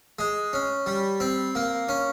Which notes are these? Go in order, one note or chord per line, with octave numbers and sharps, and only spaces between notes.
G#3
C#4
G3
C4
A#3
C#4